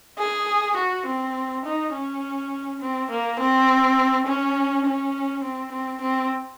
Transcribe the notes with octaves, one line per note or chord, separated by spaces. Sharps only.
G#4
F#4
C4
D#4
C#4
C4
A#3
C4
C#4
C#4
C4
C4
C4